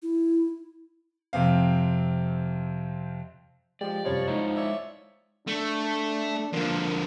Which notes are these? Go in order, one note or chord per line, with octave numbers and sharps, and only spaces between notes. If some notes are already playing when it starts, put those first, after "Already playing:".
E4
F2 C3 C4 F5
F3 G#3 G4 D5
F#2 C3 F3 G3 C#5
G#3 D#4 E4
C#5 D5 E5
A3 D4
D3 F3 A#3